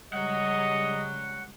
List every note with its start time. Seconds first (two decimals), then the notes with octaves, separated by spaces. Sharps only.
0.13 C#3 G3 G#3 C#5 D#5 F#5